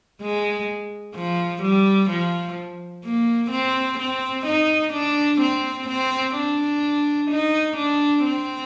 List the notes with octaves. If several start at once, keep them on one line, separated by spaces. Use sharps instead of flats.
G#3
F3
G3
F3
A#3
C4
C4
D#4
D4
C4
C4
D4
D#4
D4
C4